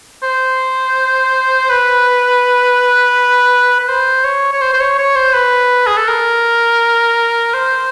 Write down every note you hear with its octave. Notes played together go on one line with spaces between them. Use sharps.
C5
B4
B4
C5
C#5
C#5
C5
C5
C#5
C#5
C5
B4
G#4
A4
A#4
C5